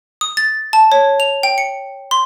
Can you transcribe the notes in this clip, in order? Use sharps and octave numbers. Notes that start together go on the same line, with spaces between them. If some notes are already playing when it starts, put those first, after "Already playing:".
D#6
A6
A5
C#5
F7
G5
C#7
C6